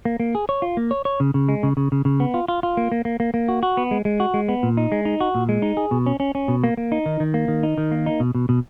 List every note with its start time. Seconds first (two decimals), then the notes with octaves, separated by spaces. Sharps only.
0.05 A#3
0.20 A#3
0.35 G#4
0.49 C#5
0.62 F4
0.77 A#3
0.91 C#5
1.05 C#5
1.20 C#3
1.34 C#3
1.49 G#3
1.63 C#3
1.77 C#3
1.92 C#3
2.05 C#3
2.20 B3
2.34 F4
2.48 F4
2.63 F4
2.77 A#3
2.92 A#3
3.05 A#3
3.20 A#3
3.34 A#3
3.48 F#4
3.63 F#4
3.77 B3
3.91 G#3
4.05 G#3
4.20 F#4
4.34 G#3
4.49 B3
4.63 A#2
4.77 D#4
4.92 G#3
5.05 D#4
5.21 F#4
5.35 A#2
5.49 G#3
5.62 D#4
5.77 G#4
5.91 B2
6.06 C#4
6.20 C#4
6.35 C#4
6.48 B2
6.64 A#3
6.77 A#3
6.92 D#4
7.06 D#3
7.20 D#3
7.34 A#3
7.48 D#3
7.63 D#4
7.78 D#3
7.91 A#3
8.06 D#4
8.20 B2
8.35 B2
8.49 B2